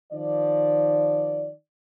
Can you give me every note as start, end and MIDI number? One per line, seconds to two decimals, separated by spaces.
0.12 1.50 51
0.12 1.50 53
0.12 1.50 74